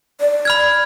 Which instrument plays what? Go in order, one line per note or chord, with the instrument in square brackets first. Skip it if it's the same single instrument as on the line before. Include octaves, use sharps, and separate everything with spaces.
[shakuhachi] D5
[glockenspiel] B5 F6 G#6